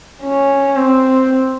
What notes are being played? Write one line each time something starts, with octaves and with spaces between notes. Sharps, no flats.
C#4
C4